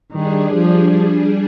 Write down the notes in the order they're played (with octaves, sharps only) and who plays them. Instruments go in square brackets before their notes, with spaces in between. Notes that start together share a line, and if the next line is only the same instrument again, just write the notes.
[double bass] D#3 [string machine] G3 D4 G#4
[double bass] F3